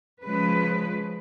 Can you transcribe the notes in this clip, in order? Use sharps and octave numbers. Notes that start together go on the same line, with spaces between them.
C#3 F3 G#3 B4